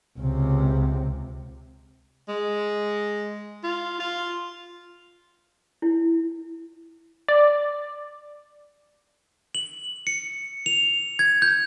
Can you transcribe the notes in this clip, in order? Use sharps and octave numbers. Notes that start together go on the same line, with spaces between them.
C#2 C3
G#3
F4
F4
E4
D5
F#7
C#7
F7
G#6
G6